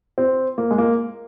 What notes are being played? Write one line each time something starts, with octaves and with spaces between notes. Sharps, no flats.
C4
A#3
G#3
A#3